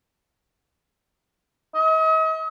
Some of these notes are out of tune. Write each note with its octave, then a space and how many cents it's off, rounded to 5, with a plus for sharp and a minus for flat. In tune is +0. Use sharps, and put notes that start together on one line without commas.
D#5 +40